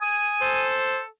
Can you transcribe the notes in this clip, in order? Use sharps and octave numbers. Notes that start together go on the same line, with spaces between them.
G#5 D#6
A4 C5